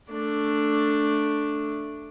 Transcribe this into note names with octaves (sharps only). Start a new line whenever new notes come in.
A3 D4